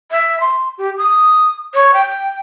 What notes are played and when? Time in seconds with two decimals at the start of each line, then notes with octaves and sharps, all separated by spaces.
0.11 E5
0.40 C6
0.78 G4
0.98 D#6
1.74 C#5
1.94 G5